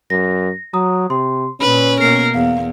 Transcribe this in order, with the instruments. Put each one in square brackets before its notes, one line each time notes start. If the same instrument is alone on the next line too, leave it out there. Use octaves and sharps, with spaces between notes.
[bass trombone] F#2 [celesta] A#6
[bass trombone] F#3 [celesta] A#5 D#6
[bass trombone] C3 [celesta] C6
[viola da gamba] A#2 B4 [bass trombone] C#4 [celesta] B5
[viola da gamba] B2 A#3 A#4 [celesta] C7
[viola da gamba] E2 [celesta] F5